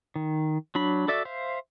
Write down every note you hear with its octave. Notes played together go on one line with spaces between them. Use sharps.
D#3
F#3 D4 B5
F#4 A4 D5 E5
C5 E5 F5